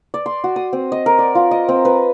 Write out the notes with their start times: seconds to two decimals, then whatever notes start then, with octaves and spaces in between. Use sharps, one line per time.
0.14 D5
0.26 C6
0.44 F#4
0.56 D#6
0.73 C4
0.92 D#5
1.06 A#4
1.19 D5
1.35 F4
1.51 D#5
1.69 C4
1.85 B4